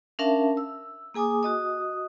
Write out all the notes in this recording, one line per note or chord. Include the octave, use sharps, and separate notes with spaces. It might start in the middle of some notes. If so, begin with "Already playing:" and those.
C#4 D4 A#4 E5 F5 A5
E6
A#3 G#4 G#5 D6 D#6
F#4 D#5 D#6